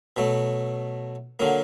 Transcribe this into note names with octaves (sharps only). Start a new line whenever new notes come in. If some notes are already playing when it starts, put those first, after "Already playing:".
B2 F#3 A3
D3 F#3 A#3